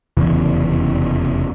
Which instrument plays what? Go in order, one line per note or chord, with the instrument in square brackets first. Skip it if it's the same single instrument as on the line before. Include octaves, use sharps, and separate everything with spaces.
[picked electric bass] F1 E2 C#3 E3